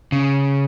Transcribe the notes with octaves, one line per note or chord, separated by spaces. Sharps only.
C#3